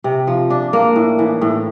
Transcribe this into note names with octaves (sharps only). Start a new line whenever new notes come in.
C3
F3
D4
A#3
A2
E3
A2